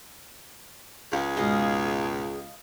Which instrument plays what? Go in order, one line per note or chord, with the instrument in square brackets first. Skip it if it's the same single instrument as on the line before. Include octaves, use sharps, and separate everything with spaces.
[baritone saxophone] C#2 [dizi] G#4 [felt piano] F5
[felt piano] G#2 B2 G#3 [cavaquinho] D#5 F5